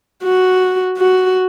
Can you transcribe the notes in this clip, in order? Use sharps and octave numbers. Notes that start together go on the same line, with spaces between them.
F#4
F#4